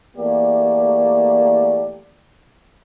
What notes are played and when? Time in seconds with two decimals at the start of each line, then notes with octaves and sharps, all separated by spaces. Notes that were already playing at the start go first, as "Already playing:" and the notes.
0.17 E2 A3 A#3 G4 D5